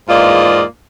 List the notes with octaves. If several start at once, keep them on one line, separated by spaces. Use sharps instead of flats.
E2 G#2 A#3 F4 D5 D#5